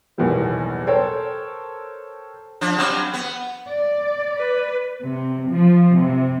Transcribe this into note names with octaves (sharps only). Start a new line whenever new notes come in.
B1 E2 A2 D#3 G3 A#3
A4 A#4 C5 C#5 G5
F3 D4
G2 F#3 C4
B3
D5
B4
C3
F3
C3